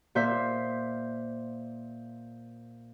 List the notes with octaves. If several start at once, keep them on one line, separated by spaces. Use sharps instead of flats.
A#2 C5 E5